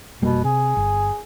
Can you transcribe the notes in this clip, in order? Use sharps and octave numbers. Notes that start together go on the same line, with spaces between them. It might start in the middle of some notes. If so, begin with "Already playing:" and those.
F1 B2 G3 A#3
C3 G#4
G1